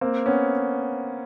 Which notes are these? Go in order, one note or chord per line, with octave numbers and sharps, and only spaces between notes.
A#3 C4
B3 C#4